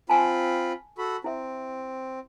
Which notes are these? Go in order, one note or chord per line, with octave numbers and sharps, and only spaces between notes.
C4 F4 G#5 A5 B5
F#4 A4 B5
C4 E4 E5